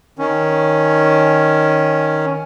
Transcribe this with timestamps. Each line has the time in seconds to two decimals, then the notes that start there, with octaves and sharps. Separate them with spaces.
0.19 D#3 C#4